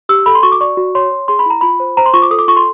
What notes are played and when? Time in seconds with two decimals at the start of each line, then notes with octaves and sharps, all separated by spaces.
0.09 G4 E6
0.26 A4 B5
0.35 C6
0.43 F#4 C#6
0.52 D6
0.61 D5 C#6
0.77 F#4
0.95 C#5 C6
1.12 C#5
1.28 G#4 C6
1.39 B5
1.46 E4 A#5
1.61 F4 B5
1.80 C5
1.97 C5 A#5
2.06 C6
2.14 F4 C#6
2.22 D6
2.31 A4 D#6
2.39 D6
2.48 F4 C#6
2.57 C6